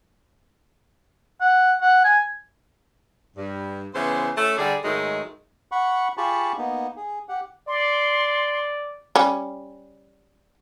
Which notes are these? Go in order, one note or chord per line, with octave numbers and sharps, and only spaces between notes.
F#5
F#5
G#5
G2
C#3 E3 B3 C5
A3 C#4 E4 A4
D3 G3 D4 G#4
G#2 D#3 F#3 G#3 A3
F#5 B5 C#6
F4 G4 G#4 A5 B5 C#6
A#3 B3 D#4
G#4
G4 F#5
D5 C6
G3 C#4